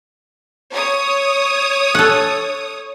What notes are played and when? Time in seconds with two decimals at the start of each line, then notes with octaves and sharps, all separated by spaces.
0.72 C#5 D#6
1.95 A4 F#5